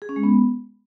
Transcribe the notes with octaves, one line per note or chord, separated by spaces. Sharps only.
G#4
C#4
G#3
B3